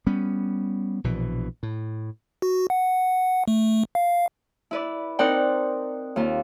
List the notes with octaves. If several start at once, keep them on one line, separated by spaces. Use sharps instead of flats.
G3 B3 C#4
A#1 B2 E3
A2
F#4
F#5
A3
F5
E4 B4 D5
C4 D#4 A#4 D5 F#5 G5
D#2 A#3 F4